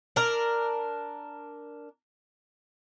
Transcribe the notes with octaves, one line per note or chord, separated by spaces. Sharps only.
D4 A#4